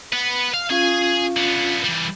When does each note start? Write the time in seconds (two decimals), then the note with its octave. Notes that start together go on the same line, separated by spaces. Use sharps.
0.12 B4 F#5
0.54 F5
0.70 C#4 F4 G#4 F5 G#5
1.37 D3 B3
1.84 E3 G3